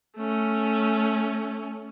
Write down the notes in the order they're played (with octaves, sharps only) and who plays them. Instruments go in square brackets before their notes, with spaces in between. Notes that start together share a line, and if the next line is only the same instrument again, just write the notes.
[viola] A3 C#4